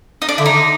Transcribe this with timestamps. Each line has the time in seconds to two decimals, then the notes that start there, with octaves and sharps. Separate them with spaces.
0.22 D#4
0.29 D4
0.38 D3 E4
0.46 D#4
0.51 D3